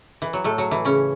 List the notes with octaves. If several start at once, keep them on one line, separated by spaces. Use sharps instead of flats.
E3
F#3
A2 A3
F#3
E3
C#3 C#4